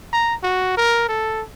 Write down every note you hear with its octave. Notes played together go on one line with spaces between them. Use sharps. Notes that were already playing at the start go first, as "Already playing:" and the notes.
A#5
F#4
A#4
A4